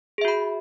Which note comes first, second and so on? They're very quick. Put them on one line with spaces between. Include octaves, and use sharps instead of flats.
G#4 E5 F#4 B5